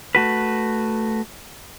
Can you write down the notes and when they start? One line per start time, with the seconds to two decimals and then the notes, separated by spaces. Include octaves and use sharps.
0.15 A3 F#4 B4